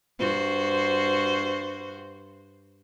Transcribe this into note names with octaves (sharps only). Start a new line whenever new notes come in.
G2 F#4 C5